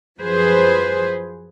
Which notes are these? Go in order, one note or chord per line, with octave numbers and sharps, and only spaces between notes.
F#2 F3 G#4 B4 C5